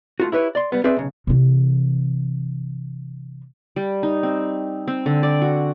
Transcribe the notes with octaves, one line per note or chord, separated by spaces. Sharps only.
A3 F4 F#4
E4 G4 B4 C#5
D5 C6
G3 B3
C4 G#4 B4 D5 E5
B1 C#3
C3 E3
G3
D#4
C4
C4
D3
D5
F#4